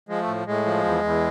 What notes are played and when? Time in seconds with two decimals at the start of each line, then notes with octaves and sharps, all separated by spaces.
0.09 F3 G#3
0.21 A3
0.27 A2
0.47 A2 G#3
0.65 F3
0.84 E2
1.03 E2